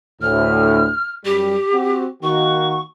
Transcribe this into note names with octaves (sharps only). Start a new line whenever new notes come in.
D2 A2 F6
F#2 G3 G4
C4 F#4
D#3 A#3 F#4 C#6